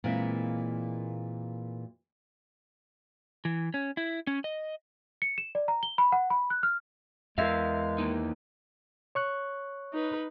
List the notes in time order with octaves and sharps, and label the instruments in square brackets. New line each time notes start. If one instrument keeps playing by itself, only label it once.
[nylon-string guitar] A#2 E3 G#3 A#3 C4 E4
[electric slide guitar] E3
C#4
E4
C#4
D#5
[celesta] C#7
E7
D5
A#5
G7
B5
F#5
B5
F#6
F6
[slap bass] E2 [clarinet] G#3 [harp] A#4 E5 [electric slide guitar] F5
[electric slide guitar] A#3 D#4
[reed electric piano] C#5 C#6 F#6
[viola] D#4 B4